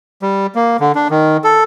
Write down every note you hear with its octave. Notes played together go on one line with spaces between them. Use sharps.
G3
A#3
D3
D4
D#3
A4